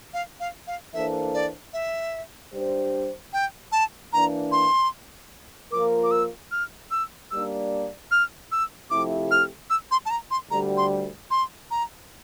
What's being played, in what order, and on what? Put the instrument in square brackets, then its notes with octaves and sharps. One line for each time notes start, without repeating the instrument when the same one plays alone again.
[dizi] F5
F5
F5
[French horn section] E3 A#3 D4 A4 C5 [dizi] E5
[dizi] D5
E5
[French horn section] G3 D4 G4 C5
[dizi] G5
A5
[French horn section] E3 A#3 D4 [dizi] A#5
[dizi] C6
[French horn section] F3 A#3 F4 A#4 [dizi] D6
[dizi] D6
E6
F6
E6
[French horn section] G3 A#3 D4 [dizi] E6
[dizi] F6
E6
[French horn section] C3 F3 A3 E4 G4 [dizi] D6
[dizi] F6
E6
C6
A5
A#5
C6
[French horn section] D2 D3 G3 [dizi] A#5
[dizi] C6
C6
A#5